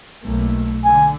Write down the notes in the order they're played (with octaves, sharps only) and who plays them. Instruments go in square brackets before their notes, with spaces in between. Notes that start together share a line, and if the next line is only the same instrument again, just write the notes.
[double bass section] B1 A3 A#3
[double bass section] D3 [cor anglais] G#5